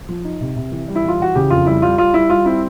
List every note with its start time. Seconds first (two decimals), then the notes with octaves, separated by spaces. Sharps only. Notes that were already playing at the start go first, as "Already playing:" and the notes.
0.09 F3
0.25 D#4
0.41 C3
0.56 C3
0.72 E3
0.88 G3
0.95 E4
1.04 E3 F4
1.20 E3 F#4
1.35 C#3 G4
1.50 F2 F4
1.66 G3 E4
1.82 G3 F4
1.98 G3 F4
2.14 G3 E4
2.30 G3 F4
2.45 C4 E4